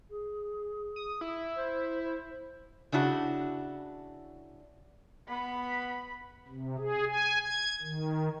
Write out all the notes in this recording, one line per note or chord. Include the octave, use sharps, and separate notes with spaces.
G#4
D#6
E4
C5
C5
C#3 D4 E4 F#4
B3 B5
C3
G#4
G#5
G#6
D#3